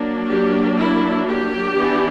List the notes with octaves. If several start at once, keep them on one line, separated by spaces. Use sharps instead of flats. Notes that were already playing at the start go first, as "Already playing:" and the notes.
Already playing: F#3 A#3 D4
G4
E4
G4
E3 B3 D4